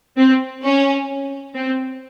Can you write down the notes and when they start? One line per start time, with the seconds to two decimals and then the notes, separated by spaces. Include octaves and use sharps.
0.17 C4
0.63 C#4
1.55 C4